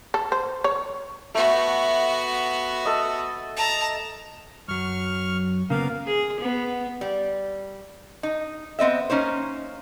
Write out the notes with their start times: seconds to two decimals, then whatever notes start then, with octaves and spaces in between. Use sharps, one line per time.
0.14 A4
0.32 C5
0.64 C#5
1.35 A3 B3 F#4
2.85 A4 D#5
3.56 A5 A#5
4.68 F#2 F#3 C#6 F6
5.70 C#3 A#3 B3 A#4 F5
6.06 G#4
6.41 B3
7.01 G3
8.23 D#4
8.79 B3 C4 D#5 E5
9.10 A#3 C#4 D#4 C5